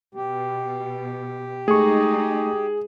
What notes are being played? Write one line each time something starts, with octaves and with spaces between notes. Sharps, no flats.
B2 G4
G#3 A3 D#4 G#4 C#6